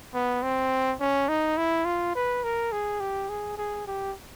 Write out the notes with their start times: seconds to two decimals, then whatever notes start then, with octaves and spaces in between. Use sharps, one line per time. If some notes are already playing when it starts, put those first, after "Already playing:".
0.14 B3
0.42 C4
1.00 C#4
1.29 D#4
1.57 E4
1.85 F4
2.15 B4
2.44 A#4
2.72 G#4
3.00 G4
3.29 G#4
3.57 G#4
3.87 G4